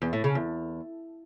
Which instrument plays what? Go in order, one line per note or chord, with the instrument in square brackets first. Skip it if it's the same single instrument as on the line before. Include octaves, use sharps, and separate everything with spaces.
[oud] E2
A2
C#3
E2